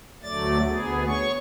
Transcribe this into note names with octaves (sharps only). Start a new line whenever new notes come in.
D2 F#3 A3 D5 A6
D2 B3 G#4
C#5 C#6